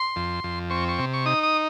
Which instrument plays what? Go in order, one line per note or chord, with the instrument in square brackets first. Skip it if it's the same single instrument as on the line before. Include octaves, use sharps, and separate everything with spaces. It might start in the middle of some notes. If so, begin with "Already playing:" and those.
Already playing: [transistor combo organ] C6
F2
F2
C4 C#6
C#6
C3
C#6
D#4 D#6
D#6